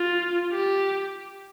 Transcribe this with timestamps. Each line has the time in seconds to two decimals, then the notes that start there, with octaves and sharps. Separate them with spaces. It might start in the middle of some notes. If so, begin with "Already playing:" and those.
Already playing: F4
0.52 G4